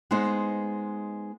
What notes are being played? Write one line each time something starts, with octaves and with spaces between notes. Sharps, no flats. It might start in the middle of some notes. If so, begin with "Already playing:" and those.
G#3 B3 D#4 C5